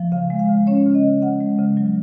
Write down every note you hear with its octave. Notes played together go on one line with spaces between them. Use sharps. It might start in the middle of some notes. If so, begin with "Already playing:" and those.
Already playing: F3
C#3 F5
G#3
F5
C#3
C#4 C#5
C#3
D#5
C#3
C#3 F#5
G#3
C#3
F#3